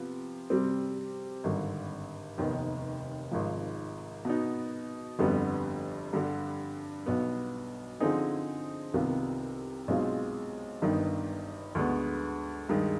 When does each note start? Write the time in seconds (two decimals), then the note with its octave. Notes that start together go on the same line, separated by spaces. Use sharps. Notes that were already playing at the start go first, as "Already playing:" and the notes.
Already playing: C3 F3 B3
0.50 C3 G3 C4
1.44 G#1 G2 D3
2.38 F1 D#2 D#3 B3
3.31 G#1 G#2 F3
4.25 B2 B3 D#4
5.19 G1 F2 D3 G3 B3
6.13 G2 D3 G3
7.06 B1 B2 B3
8.00 D3 F3 C4 D#4 G#4
8.94 C2 C3 D#3 B3 F4
9.88 B1 B2 G#3 C4 F4
10.82 G1 G2 D#3 B3 D#4
11.75 D2 D3 G#3 B3
12.69 G2 D#3 G#3